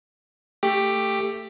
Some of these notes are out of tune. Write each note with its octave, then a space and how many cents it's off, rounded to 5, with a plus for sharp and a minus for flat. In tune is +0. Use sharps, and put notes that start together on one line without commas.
A3 +20 G4 +10